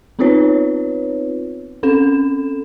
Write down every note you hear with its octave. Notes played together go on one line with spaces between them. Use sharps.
B3 C4 D#4 F4 B4 C#5
C4 C#4 A4 E7